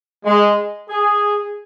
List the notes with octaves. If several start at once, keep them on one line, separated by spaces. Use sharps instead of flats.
G#3
G#4